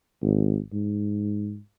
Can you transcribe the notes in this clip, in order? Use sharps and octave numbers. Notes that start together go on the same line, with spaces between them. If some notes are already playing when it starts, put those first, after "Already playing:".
G#1
G#2